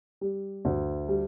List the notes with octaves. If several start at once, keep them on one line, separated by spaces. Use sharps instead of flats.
G3
D2
G3